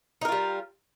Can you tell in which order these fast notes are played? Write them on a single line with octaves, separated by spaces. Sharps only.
D#4 A#4 F4 G3